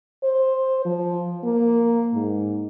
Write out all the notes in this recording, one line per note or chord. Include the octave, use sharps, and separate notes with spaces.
C5
F3
A#3
G#2